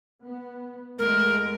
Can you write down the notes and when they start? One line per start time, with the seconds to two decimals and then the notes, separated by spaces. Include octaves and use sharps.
0.25 B3
0.99 E2 G#3 A3 A#4